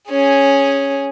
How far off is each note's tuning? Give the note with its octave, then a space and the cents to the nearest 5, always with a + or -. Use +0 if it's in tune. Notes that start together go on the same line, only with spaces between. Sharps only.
C#4 +0 G#4 +0